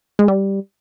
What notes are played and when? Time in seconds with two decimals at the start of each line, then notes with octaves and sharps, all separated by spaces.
0.19 G#3
0.28 G3